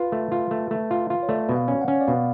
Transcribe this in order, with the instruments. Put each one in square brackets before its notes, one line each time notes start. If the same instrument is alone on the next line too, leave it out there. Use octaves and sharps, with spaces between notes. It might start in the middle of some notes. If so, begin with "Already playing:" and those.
Already playing: [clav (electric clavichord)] F4 [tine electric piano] B4
[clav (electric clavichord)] A3
F4
A3
A3
F4
F4
[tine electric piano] C#5
[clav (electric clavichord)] A3 [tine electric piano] D5
[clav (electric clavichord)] B2
[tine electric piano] F5
[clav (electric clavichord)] C#4
[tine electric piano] F#5
[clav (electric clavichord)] C#4
[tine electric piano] D5
[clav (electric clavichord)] B2 [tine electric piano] F5